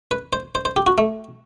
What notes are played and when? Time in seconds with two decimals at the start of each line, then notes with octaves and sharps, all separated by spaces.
0.11 B4
0.33 C5
0.55 C5
0.65 C5
0.76 G4
0.87 F#4
0.98 A3